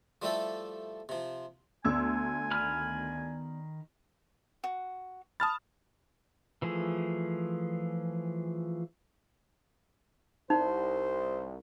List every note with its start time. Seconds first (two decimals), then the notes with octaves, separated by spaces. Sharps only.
0.22 F3 G3 A3 E4 G4 A4
1.09 C3 F3
1.85 D2 B3 D5 G#5 E6 G#6
2.51 D#3 B5 F6
4.64 F#4
5.40 A5 B5 D#6 F6 A6
6.62 E3 F3 A3 G#4
10.50 C2 D#4 C5